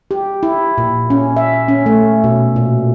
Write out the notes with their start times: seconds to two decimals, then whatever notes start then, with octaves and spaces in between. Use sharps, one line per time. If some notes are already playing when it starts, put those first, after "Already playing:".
0.11 G4
0.43 E4
0.78 A#2
1.10 C#4
1.37 E5
1.68 C#4
1.86 A3
2.24 B2
2.56 A#2